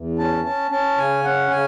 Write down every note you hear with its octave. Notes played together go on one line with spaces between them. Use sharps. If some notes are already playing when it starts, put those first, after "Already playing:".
Already playing: E2
C#4 A5
C#4 A5
C#4 A5
C#3 G#5
C#4 F#5
C#3 G#5